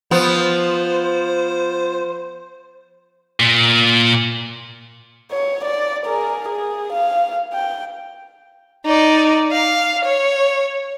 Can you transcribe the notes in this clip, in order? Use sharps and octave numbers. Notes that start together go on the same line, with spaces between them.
F3 B3 C5
A#2
C#5
D5
G#4 A#4
G#4
F5
G5
D#4 D5
F5
C#5